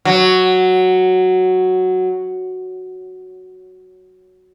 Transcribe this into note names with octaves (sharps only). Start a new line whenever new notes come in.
F#3